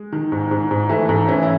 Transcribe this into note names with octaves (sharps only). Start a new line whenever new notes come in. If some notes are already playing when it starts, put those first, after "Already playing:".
Already playing: G#3
D#3
G#2
G#2
G#2
E3 A3
G#2 A3
E3 C#4
E4